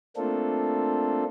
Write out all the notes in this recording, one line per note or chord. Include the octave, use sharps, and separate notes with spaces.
A3 A#3 C4 D4 F4 A4